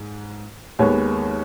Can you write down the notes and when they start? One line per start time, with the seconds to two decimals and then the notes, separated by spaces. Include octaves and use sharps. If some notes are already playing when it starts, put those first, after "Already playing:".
Already playing: G#2
0.79 D#2 D#3 G#3 B3 C#5